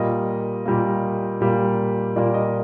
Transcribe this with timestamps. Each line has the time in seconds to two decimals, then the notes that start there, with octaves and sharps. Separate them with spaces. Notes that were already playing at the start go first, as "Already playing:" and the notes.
Already playing: A#2 G3 A#3 D#5
0.66 A#2 G3 A#3
1.40 A#2 G3 A#3
2.16 A#2 G3 A#3 D5
2.34 D#5